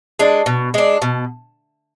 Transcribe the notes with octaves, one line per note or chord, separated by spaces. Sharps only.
G#3 D4
B2
G#3 D4
B2